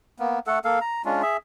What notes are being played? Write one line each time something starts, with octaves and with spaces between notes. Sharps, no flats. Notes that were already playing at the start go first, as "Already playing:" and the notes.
A#3 B3
A3 A4 F#5
A#3 A4 F5
A#5
G#3 C#4 D4 F4
G#4 E5